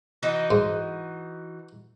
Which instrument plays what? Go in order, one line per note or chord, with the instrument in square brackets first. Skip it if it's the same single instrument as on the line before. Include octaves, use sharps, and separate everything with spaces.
[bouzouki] E3 D#4 F#4
[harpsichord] G#2